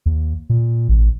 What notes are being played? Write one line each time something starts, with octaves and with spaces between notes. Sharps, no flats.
D#2
A#2
A1